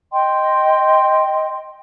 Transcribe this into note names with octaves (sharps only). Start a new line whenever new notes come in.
D#5 G5 C6